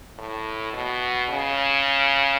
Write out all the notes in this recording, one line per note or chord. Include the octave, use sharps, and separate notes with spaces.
A2
B2
C#3